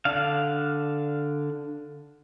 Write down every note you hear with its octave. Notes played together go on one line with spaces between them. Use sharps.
D3 D4 F5